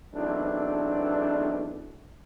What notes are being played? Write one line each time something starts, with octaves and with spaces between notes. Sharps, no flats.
B1 E2 A3 C4 D4